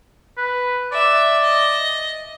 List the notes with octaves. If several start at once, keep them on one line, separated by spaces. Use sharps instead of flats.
B4
D5 E5
D#5